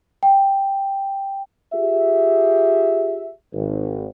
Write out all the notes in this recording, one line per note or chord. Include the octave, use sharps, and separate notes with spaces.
G5
F4 G4 G#4 E5
G#1